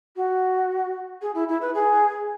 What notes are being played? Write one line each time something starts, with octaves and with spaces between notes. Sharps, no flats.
F#4
G#4
E4
E4
B4
G#4